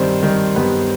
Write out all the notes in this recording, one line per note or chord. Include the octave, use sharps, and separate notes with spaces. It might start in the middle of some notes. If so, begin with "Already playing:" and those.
Already playing: G2 D#3 G3 C4 C5
G2 D#3 G3
G2 D#3 G3 B3 B4